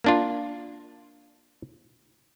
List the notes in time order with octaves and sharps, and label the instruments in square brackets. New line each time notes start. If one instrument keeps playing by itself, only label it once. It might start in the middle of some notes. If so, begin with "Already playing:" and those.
[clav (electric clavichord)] A#3 D4 F4